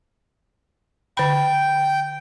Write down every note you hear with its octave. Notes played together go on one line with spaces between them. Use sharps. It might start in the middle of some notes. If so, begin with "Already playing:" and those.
D3 G5 B5